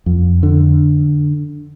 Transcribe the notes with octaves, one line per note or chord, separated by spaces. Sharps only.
F2
D3